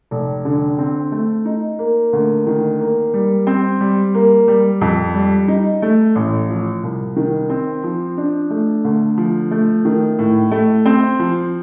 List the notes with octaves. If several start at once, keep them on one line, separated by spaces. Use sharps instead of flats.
F1
D3
C4
A3
D#4
A#3
D2
D#3
A#3
G3
C4
G3
A#3
G3
F2
G3
D#4
A3
A1
F3
C2
D#3
C4
F3
D4
A3
D2
F3
A3
D#3
A2
A3
C4
F3